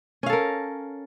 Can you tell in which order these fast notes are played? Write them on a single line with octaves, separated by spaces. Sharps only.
C#4 F5 A4 A#4